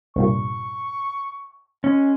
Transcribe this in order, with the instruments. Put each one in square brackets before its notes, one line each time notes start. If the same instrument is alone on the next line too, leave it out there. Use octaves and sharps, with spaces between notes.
[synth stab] C2 G2 A#2 [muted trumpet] C#6
[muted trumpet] G#3 [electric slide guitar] C#4